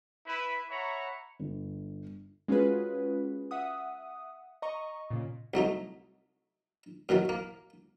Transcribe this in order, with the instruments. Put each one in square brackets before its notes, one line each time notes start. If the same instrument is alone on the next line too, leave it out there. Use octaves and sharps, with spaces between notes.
[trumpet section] E4 B4 B5
C#5 E5 F#5 A#5 B5 C#6
[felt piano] G1
[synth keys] G#3 C#4 F4 F#4 G#4 B4
E5 F#5 D#6
D#5 A#5 C#6
A#2 C#3
[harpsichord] C2 F#3 A3 D#4
F#2 D#3 E3 F#3
A#3